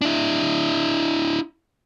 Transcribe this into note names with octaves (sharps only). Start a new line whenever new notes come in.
D4 E4